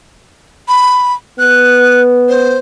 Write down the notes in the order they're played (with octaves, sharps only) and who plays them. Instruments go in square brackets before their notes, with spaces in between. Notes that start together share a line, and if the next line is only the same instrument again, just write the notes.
[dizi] B5
[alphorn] B3 [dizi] F#6
[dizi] C5